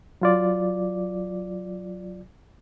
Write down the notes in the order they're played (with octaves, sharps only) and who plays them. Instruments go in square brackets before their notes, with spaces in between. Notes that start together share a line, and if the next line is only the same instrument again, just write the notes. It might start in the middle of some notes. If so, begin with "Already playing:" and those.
[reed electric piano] F#3 F4 D5